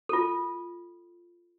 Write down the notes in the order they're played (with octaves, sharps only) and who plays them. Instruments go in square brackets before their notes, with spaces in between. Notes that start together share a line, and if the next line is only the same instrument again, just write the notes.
[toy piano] F4 A4